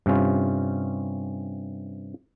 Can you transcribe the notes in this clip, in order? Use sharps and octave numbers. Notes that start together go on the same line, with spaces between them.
G2 C3 C#4 F4